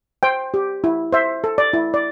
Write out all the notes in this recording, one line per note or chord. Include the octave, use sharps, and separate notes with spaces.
C5 G5
G4
E4
C5 E5
A4
D5
E4
D5